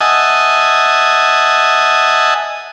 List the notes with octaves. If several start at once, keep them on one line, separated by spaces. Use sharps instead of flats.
D#5 E5 F#5 G#5 A5 D#6